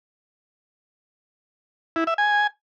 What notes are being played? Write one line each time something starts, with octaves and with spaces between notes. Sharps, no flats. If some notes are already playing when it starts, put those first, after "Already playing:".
E4
E5
G#5